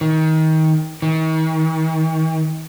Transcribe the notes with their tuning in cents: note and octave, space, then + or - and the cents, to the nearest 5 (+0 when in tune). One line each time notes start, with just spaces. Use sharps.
D#3 +25
D#3 +45